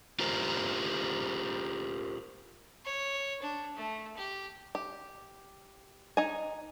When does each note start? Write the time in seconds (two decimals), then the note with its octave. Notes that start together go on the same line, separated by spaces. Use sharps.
0.19 F4 G4 A#4 C5
2.85 C#5
3.42 D4
3.76 A3
4.17 G4
4.75 G4
6.17 D#4 G#5